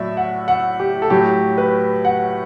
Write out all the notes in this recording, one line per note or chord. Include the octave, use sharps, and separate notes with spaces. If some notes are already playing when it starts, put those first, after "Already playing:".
Already playing: A2 F#3 D5 E5
F#5
F#5
G4
A4
A2 F#3 G4
B4
F#5